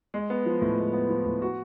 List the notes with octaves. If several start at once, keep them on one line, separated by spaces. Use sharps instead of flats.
G#3
B3
F3
A2
G#3
B3
F3
A2
F#4